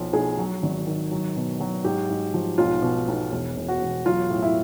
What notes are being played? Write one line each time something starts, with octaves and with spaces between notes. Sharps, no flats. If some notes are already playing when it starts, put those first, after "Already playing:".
Already playing: B1 F3
B1 G#4
F#3
G#1
D#3
F#3
B2
F#3
G#2 G4
G#2
F3
B1 F4
B2
B1
E1
E1
F#4
E1
F#3 F4
A2
E4